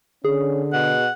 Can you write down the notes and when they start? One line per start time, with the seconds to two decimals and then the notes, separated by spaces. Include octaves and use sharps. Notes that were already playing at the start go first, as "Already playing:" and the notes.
0.25 D3 C#4 G#4
0.73 B2 F#5